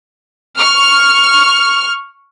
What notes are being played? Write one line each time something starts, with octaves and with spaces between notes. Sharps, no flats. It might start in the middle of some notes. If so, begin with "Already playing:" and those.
C#6 F6